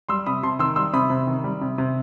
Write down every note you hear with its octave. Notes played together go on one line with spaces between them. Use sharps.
G3 C6 E6
C3 B5 D#6
C3 A5 C6
D#3 C6 E6
G3 C6 E6
C3 B5 D#6
C3
D#3
G3
C3
C3